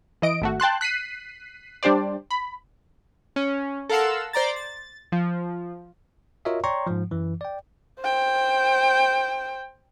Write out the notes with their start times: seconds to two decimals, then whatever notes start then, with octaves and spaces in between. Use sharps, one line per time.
0.22 E3 D#5 D7
0.41 G#1 A3 F#4
0.60 G5 A5 C6 F#6
0.81 F#6 B6 C7 D#7
1.83 G3 D4 G4 C5 D5
2.31 B5
3.36 C#4
3.89 A4 A#4 F5 F#5 C6 E6
4.33 C5 D5 A#5 A6
4.56 A6
5.12 F3
6.45 F4 F#4 A#4 C#5 D#5 E5
6.64 C#5 D5 G5 A#5 C6 C#6
6.87 G#2 F3
7.11 F#2 E3
7.41 D5 G5
8.00 C5 G5